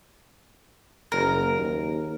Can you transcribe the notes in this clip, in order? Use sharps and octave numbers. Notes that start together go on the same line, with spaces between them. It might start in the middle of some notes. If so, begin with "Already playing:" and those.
F#1 A#4
D#2